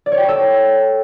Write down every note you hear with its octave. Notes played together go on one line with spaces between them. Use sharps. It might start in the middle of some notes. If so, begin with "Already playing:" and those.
D5
C#5
G5
C#5
A4